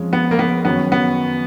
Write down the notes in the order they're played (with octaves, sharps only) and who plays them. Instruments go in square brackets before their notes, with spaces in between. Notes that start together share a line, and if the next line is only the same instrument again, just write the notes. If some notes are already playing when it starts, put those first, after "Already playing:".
Already playing: [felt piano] F2 F3 G#3 C#4
[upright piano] B3
A#3
B3
[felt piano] F#2 D#3 F#3 C#4 [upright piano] B3
[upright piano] B3